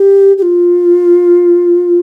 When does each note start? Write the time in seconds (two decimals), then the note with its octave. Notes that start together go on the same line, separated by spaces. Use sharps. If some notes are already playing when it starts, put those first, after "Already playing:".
Already playing: G4
0.38 G4
0.42 F4